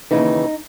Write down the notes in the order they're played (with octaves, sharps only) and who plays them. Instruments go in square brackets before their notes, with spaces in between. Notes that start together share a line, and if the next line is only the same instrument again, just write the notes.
[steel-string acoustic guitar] D#2 C#3 E3 [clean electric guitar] D#4